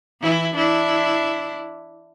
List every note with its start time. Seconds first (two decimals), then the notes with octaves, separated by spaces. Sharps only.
0.22 E3 E4
0.55 D4 E4